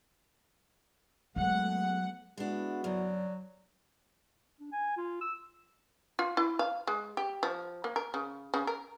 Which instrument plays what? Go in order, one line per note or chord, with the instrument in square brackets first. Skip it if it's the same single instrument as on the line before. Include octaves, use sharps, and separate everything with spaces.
[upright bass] F#3 [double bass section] G#3 A3 B3 [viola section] F#5
[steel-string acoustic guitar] G#3 D4 [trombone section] B3 E4 F#4
[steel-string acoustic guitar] F#2 D3 [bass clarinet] F#3 [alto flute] D5
[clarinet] D4
G#5
F4
E6
[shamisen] F4
E4
F5
G#3
G4
F3
A#3
A#4
C#3
C#3
A#4